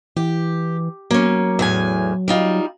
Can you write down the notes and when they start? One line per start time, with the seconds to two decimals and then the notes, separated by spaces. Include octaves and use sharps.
0.17 E3 G4
1.11 F#3 A#3 C#4
1.59 E2 A2 G#5
2.28 G3 D#4 F4